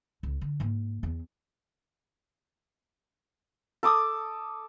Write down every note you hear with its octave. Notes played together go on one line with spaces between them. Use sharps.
C#2
D3
G#2 A#3
E2
A4 D6 D#6